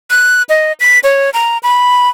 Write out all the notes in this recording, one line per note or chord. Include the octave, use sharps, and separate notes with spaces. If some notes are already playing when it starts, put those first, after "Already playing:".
F#6
D#5
B6
C#5
A#5
B5